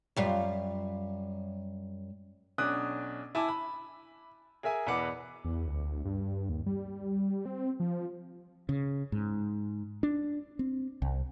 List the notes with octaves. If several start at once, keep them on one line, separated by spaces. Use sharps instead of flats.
F#2 G3 F4
B1 C#4 D4 D6 D#6 F#6
E4 G#5 A5 D6 E6
B5
G#4 A#4 E5 G#5
E2 B2 B4 F#5 D6 C#7
E2
D2
G2
D#2
G3
C4
F3
C#3
G#2
D4
C4
C2